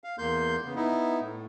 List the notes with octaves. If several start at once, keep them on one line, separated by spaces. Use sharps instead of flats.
F5
E2 A#3 C6 G6
C#3 B3
B3 D#4 E4
A2